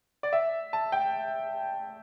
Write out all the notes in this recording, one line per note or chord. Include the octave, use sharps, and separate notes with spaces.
D5
E5
A5
G5